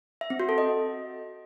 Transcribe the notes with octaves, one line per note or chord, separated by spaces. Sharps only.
E5
C4
F#4
A4
D#5